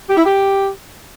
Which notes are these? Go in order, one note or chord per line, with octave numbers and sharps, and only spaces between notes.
G4
E4
G4